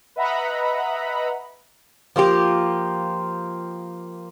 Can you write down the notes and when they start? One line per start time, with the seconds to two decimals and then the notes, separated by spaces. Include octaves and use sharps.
0.16 B4 D#5 E5 F#5 A#5 B5
2.16 F3 A#3 F4 G4